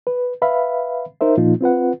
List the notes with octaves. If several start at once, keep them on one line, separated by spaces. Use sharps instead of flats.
B4
B4 E5 F5 B5
D#4 A#4 C5 E5
A#2 F3 A#3 D#4 F4
C4 F4 B4 F#5